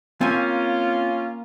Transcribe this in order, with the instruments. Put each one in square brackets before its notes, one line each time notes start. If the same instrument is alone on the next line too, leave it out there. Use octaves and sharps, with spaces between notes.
[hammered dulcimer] A#3 [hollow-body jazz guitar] C4 G#5 [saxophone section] C#4 F4